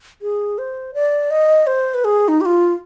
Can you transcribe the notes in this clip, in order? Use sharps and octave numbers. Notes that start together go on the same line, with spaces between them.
G#4
C5
D5
D#5
C5
B4
G#4
D#4
G4
F4